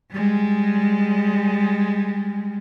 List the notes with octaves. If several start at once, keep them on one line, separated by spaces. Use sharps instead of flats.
G3 G#3